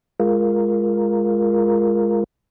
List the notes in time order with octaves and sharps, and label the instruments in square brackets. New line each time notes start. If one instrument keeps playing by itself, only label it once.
[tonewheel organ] G#3 F4 A#4